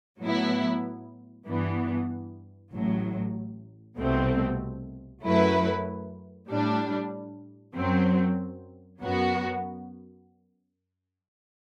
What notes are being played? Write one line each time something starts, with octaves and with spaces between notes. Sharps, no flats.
A2 F#3 B3 E4
G2 E3 B3
A1 A2 F#3
C2 B2 A3 C4
F#2 F#3 A3 E4 B4
A2 G3 D4
F#2 F#3 C4
F#2 F#3 B3 F#4